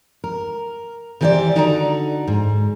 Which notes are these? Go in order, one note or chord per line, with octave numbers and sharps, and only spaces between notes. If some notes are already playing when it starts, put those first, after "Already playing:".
A#4
D#3 E3 G4 B4 C5 D5
D3 D#4 F#4 D5 A5 A#5
G#2